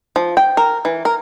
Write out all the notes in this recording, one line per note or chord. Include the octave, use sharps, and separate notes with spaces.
F3
G5
A#4
E3
A#4